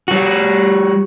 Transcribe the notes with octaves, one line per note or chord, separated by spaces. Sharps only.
G3 F#4